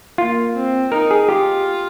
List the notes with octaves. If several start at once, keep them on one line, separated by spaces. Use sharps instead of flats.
A#3 F4
C4
D#4 A#4
G#4
F4 G4